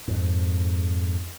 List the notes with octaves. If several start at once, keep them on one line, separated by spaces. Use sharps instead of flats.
F2 G#2